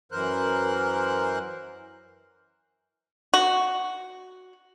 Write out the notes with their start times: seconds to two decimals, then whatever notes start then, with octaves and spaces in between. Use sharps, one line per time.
0.12 F#2 E3 A#4 C5 F#6
3.34 F#4